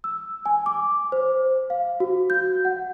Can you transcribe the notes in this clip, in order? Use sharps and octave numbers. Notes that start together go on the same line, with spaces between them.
E6
G#5
D6
C5
F5
F#4
G6
F#5